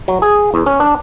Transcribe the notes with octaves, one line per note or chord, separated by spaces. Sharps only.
F#3
G#4
E2
C#4
D4